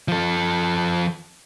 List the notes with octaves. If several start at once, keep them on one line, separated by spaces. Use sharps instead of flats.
F3 A4